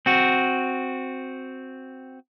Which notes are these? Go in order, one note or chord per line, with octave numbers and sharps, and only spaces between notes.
C4 F#4